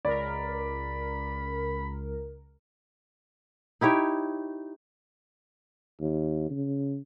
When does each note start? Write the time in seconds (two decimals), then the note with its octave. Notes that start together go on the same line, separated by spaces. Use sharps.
0.05 C#2 A#4 D5 B5
3.81 D#4 E4 G4 C#5
6.00 D#2
6.50 C#3